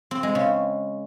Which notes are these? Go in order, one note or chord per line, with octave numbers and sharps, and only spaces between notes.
C4
G#3
C#3